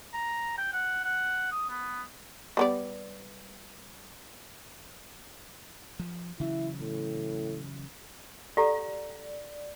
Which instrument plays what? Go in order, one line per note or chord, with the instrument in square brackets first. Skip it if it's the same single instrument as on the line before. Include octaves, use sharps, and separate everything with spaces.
[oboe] A#5
G5
F#5
F#5
D#6
B3
[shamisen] G3 B3 D5
[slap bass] F3
[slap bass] C#3 E3 F#3 [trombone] E4
[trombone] A2
[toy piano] G4 A4 A#5 [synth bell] D5